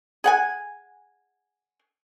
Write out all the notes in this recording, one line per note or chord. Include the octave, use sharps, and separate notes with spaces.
G#4 F#5 G#5